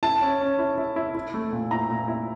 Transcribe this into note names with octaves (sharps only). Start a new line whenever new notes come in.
E4 A5
C#4
C#4
E4
E4
E4
E4
A3
A#2
E4 A#5
A#2
E4